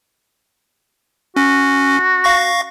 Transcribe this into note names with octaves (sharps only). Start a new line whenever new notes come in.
C#4 F#4
F5 C#6 A#6